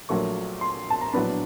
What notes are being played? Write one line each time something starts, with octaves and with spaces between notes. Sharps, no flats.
A#1 A#2 F#3 A3 C#6
C6
A5
A#5
A#1 A2 F#3 B3 D4 B5